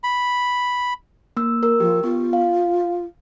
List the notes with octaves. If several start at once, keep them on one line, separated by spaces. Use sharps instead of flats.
B5
A#3 E6
A#4 E6
F3 G4
B3 F4
F5